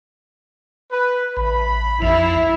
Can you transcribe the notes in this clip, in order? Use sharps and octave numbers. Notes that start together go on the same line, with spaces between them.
B4
A1 B5
A#1 F2 F3 E4